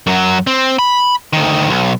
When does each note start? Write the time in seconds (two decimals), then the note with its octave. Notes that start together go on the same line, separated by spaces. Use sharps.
0.07 F#2 F#3
0.47 C4
0.79 B5
1.33 D2 D#3
1.69 B1